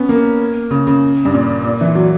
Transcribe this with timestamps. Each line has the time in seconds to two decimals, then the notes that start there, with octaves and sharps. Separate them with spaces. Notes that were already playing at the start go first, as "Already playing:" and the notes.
Already playing: B3 C#4
0.09 A#3
0.71 C#3
0.87 C#3
1.25 G2
1.34 A#2
1.64 A#2
1.81 E3
1.95 F#3